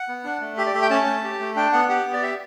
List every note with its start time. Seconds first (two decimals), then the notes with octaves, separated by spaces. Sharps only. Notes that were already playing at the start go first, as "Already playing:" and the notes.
Already playing: F#5
0.08 B3
0.24 D4
0.41 A3
0.57 G4 E5
0.66 D5
0.74 A3 E5
0.82 G5
0.90 C#4 A5
1.06 A3
1.24 G4
1.40 A3
1.56 D4 G5
1.73 B3 F#5
1.89 G4 F#5
2.06 B3
2.13 D5
2.22 G4 E5